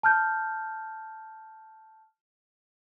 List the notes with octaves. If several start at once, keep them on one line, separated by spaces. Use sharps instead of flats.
A5 F6 G6